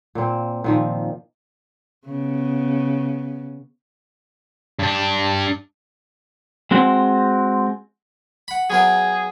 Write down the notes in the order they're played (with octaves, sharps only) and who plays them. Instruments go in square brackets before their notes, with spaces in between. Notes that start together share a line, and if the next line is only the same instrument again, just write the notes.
[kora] A#2 A#3 C4
A#2 D#3 F3
[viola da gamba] C#3 B3
[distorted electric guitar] G2 D4
[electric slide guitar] G#3 C4 F#4
[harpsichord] F#5 B5
[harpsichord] F#3 B3 A#4 [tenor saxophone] G#4